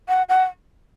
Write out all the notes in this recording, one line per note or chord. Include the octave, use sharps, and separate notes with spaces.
F#5
F#5